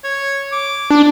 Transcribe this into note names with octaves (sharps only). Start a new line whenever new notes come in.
C#5
D6
D4